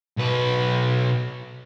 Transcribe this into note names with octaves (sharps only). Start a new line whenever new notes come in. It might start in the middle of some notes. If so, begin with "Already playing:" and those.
B1 B4